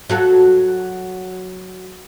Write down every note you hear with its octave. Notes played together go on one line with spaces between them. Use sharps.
F#3 F#4 A4